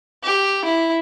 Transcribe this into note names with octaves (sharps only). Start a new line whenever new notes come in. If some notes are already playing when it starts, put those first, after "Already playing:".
G4
E4